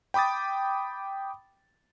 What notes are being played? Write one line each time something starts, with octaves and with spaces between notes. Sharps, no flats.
G5 B5 D6 D#6 A6